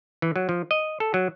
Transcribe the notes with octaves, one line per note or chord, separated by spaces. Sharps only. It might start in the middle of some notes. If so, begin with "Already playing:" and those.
E3
F#3
F3
D#5
A4
F#3